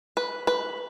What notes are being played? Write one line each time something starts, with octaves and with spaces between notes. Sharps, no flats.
B4
B4